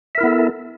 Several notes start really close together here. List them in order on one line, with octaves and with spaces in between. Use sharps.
E5 A#4 E4 B3 A4